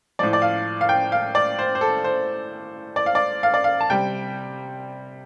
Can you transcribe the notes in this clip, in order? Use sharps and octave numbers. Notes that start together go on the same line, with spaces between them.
A2 F3 D5
D5
F5
F5
G5
F5
D5
C5
C5
A4
C5
D5
F5
D5
F5
D5
F5
A5
C3 G3 G5